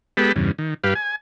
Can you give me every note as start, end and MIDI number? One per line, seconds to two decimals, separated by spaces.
0.17 0.32 56
0.17 0.32 59
0.17 0.32 67
0.17 0.32 69
0.17 0.32 83
0.36 0.52 40
0.36 0.52 43
0.36 0.52 49
0.58 0.74 51
0.84 0.94 43
0.84 0.94 67
0.84 0.94 71
0.84 0.94 77
0.95 1.16 80